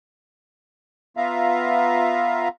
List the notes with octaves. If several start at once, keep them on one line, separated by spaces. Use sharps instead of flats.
B3 F4 E5 F5 A#5